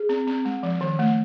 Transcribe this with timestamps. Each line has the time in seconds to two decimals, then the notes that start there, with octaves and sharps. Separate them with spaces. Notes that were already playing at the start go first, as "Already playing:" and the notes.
Already playing: G#4
0.09 C4
0.27 C4
0.45 G#3
0.63 F3
0.81 D#3
0.99 A3